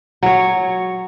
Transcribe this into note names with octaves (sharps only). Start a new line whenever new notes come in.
F#3 C#5